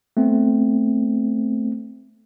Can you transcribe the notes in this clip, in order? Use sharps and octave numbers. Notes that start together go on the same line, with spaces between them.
A3 B3 C4